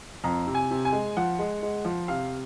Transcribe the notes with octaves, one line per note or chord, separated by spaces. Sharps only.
F2 A#5
C3
G#5
C3
G#5
G#3
F3 F#5
G#3
G#3
F3
C3 F5